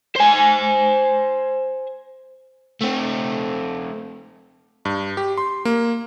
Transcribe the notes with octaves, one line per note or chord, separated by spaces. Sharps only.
C5 G#5
A3 C4
G2
G4
C6
A#3